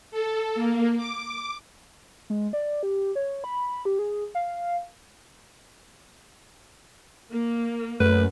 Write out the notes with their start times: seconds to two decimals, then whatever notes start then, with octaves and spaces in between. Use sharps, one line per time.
0.11 A4
0.55 A#3
0.97 D6
2.30 G#3
2.53 D5
2.83 G4
3.15 C#5
3.44 B5
3.85 G4
3.99 G#4
4.35 F5
7.31 A#3
8.00 F#2 A3 B4